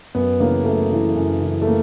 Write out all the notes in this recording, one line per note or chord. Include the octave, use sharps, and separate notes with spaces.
F#2 B3
C#3 E3 A#3
F#2 A3
C#3 E3
F#2
C#3 E3
A3
A#3